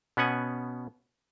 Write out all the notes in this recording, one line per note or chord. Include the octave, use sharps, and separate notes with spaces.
B2 B3 C#4 F#5 G#5